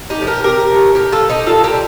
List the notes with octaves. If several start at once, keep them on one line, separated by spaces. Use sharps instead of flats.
D#4 G4
F3 A3
G4 A#4
C3 G4 A#4
F3 A3
A2 G4 A#4
F4 A4
F3 A3
D#4 G4
A#2 F4 A4
G4 A#4
G3